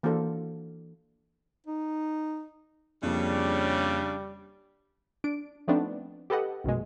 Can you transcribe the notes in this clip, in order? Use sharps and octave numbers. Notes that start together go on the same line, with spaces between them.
E3 A#3 D4 F#4 A4 C5
D#4
F2 C#3 G3 A#3 D4
D4 D7
F3 A3 B3 C4 D4 D#4
G4 A4 B4 D#5 F#5
A#1 F#2 B2 G#3